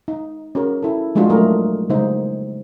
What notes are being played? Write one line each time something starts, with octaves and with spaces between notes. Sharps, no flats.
D#4
C#4 F#4 G#4 A#4
E4 A4
F3 G#3 A#3 D4 F4 F#4
F#3 A3 D#4 A#4
C#3 G3 G#3 A#3 D#4 C5